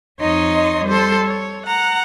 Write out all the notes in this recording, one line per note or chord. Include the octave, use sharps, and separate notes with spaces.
F2 D#4 C#5 D#5 C6
G3 A4 C5 C6
C#5
F#5 A#5